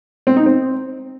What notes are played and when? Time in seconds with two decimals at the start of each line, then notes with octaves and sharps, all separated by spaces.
0.27 C4
0.36 D#4
0.46 C4